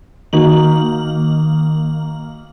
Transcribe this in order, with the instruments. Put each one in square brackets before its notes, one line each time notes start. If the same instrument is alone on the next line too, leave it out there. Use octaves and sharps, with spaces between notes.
[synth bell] D#3 A#3 F#7 [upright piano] D#4 F#4